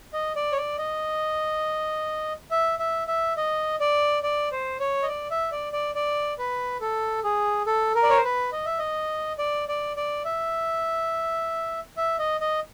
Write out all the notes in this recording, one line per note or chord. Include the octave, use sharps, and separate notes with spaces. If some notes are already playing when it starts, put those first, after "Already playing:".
D#5
D5
C#5
D5
D#5
E5
E5
E5
D#5
D5
D5
C5
C#5
D#5
D5
E5
D5
D5
D5
B4
A4
G#4
A4
A#4
D5
C#5
C5
B4
D#5
E5
D#5
D5
D5
D5
E5
E5
D#5
D#5